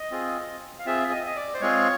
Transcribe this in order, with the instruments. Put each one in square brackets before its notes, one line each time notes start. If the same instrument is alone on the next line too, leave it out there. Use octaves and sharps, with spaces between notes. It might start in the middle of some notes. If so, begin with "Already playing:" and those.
Already playing: [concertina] D#5
C4 F4 G#4
F5
C4 F4 G#4 E5
D#5
D#5
D5
C5
G#3 C4 F4 G#4 C#5